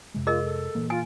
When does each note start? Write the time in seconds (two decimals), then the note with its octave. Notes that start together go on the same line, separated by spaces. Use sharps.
0.14 F2 C3 G#3
0.27 F4 G#4 A#4 D#5
0.43 A4
0.75 A#2 E3 A#3
0.90 F4 G#5